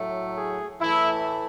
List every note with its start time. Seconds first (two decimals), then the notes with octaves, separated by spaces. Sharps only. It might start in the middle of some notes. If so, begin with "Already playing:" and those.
Already playing: A2 F#3 A3
0.35 G#4
0.80 A2 E3 A3 E4